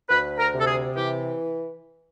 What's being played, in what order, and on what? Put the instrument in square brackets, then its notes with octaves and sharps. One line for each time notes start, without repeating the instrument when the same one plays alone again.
[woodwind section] D2 B4
A#4
C3
A4
G#4
E3 G4